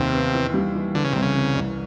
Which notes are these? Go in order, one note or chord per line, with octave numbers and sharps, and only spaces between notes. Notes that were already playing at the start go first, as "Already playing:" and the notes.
Already playing: D#2 C3
B3
E3
G3
E3
D3 E3
C#3
C2 C3
C#3
C3
C2